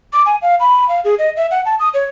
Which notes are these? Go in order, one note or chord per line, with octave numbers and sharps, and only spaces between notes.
D6
G#5
F5
B5
F5
G#4
D#5
E5
F#5
A5
D#6
C#5